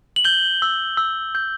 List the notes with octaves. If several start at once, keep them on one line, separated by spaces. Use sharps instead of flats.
F#7
G6 G7
E6
E6
G6